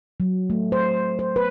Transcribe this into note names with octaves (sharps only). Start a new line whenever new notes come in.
F#3
A3
C5
C5
B4